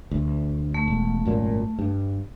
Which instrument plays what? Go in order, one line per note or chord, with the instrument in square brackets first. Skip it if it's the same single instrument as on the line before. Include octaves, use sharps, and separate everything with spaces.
[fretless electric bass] D2
[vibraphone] A3
[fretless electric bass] E1
G#1 F#2 A#2
G2